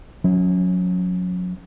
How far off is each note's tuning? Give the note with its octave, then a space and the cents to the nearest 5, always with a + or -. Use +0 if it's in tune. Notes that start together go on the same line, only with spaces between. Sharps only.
F#3 -35 C#4 +0